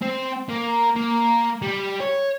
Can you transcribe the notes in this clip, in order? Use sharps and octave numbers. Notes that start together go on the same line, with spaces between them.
C4
A#3
A#3
G3
C#5